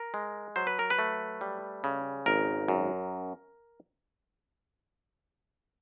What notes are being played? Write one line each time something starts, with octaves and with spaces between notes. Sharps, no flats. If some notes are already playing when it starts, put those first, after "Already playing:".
Already playing: A#4
G#3
F#3 C5
B4
A#4
B4
A3
G3
C#3
G#1 A#4
F#2